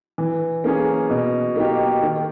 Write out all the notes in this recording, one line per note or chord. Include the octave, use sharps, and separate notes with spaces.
E3
A#3 C#4 G#4
B2
A#3 D#4 G4
D#3